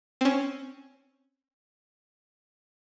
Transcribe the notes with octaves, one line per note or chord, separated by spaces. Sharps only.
C4 C#4